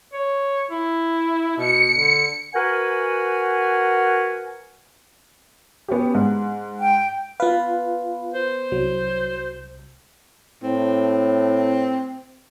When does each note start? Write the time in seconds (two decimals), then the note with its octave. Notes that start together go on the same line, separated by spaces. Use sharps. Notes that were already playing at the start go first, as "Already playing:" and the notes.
0.13 C#5
0.71 E4
1.58 B2 C#7
1.94 D3
2.54 F#4 A#4 B4 F#5 G#5
5.88 B3 C#4 G4
6.15 G#2
6.80 G5
7.40 B3 F4 B4 F5
8.34 C5
8.72 C2 F#3
10.63 A2 C4